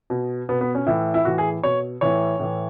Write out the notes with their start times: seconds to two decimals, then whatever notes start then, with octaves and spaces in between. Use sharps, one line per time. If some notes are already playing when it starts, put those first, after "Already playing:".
0.10 B2
0.49 B2 B3
0.61 B3
0.75 C#4
0.86 A2 E3 E4
1.14 E4
1.25 A2 E3 F#4
1.38 G#4
1.63 B2 C#5
2.01 A2 E3 C#5
2.39 A2 E3